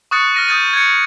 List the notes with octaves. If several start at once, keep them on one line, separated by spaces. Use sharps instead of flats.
C#6 D#6 F#6 A6 C#7
F6 A#6 D#7
D#6 G6 A6 D#7
G#6 C#7